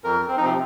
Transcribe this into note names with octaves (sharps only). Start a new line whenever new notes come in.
F2 A#4
C4
D#4
C3 F3 C4